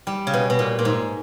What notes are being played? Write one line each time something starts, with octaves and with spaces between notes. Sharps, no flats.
G3
C#3
B2
B2
A#2
A#2
G#2